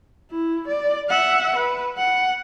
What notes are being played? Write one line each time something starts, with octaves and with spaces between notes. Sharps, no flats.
E4
D5
E5 F#5
B4
F#5